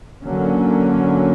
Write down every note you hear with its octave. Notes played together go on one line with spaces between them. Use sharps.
D3 F#3 A#3 C#4